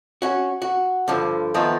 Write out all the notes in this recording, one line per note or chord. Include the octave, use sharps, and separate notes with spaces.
C#4 F#4
F#4
G2 D3 F3
D#3 F3 A3 B3 D#4 F4